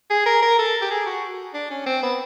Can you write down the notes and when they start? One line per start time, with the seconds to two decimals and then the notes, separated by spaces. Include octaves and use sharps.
0.10 G#4
0.26 A#4
0.42 A#4
0.59 A4
0.81 G4
0.90 G#4
1.06 F#4
1.54 D4
1.70 C#4
1.86 C4
2.03 B3